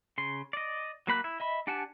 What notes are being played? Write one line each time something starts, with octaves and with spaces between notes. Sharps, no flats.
C#3 C6
D5 D#5
F#3 A#3 B5 F#6
E4
D#5 E5 B5
D4 G4 F#5 G#5 A5